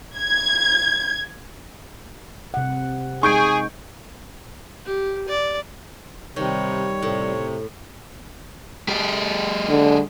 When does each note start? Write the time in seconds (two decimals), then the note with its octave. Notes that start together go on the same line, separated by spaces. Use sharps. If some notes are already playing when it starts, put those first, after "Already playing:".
0.18 G#6
2.54 C3 F#5
3.23 G#3 D#4 G#4 C#6 G6 D7
4.85 G4
5.28 D5
6.36 C3 D#3 G3 C#5
7.03 A2 C3
8.88 G#3 G4
9.69 D3